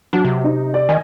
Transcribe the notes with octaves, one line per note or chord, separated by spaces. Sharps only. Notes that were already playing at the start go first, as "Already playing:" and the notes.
F#3 D4
C3
D#4
D5
D#3 D#5 G#5